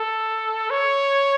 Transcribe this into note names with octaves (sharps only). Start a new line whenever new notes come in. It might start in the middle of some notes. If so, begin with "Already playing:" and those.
Already playing: A4
C#5